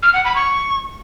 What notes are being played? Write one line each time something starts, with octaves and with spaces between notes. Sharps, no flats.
F6
F#5
B5
C#6